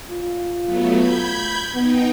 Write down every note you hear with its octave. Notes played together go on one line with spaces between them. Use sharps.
F4
F#3 A3 B3
B5 G6 G#6
B3 D#4 G5